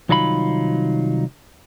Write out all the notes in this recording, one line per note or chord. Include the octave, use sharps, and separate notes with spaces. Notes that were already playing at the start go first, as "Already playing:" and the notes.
C2 D#3 F#3 D#4 F4 B5